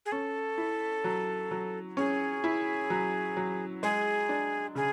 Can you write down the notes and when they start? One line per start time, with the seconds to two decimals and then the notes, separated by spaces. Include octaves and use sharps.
0.06 G#4
0.12 C#4 A4
0.58 E4
1.04 F#3
1.51 F#3
1.97 C#4 G#4
2.44 E4
2.90 F#3
3.37 F#3
3.83 G#3 G#4
4.29 D4
4.75 C#3 G#4